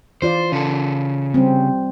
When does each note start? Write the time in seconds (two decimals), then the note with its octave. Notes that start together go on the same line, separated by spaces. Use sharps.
0.22 E3 F4 C5 D5
0.52 C#3 A4
1.34 G3 C4